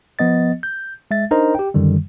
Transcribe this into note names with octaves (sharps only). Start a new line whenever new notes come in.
F3 B3 D#5 A6
G6
G#3 E5 A6
D4 D#4 A#4 C5 D#5 A#5
G4 G5
F#2 D3 D#3 G3